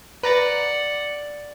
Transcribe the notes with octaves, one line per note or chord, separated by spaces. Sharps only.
B4 D5 F#5 A#5 A6